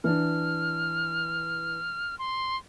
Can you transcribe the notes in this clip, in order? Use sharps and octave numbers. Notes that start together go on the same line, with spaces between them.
E3 D4 F6
C6